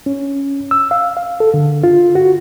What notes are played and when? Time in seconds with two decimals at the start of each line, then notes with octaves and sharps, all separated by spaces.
0.06 C#4
0.71 E6
0.91 F5
1.17 F5
1.40 A4
1.54 D3
1.84 F4
2.15 F#4